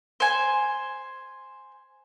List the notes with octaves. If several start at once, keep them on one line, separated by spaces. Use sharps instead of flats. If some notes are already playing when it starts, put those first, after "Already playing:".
C5 G#5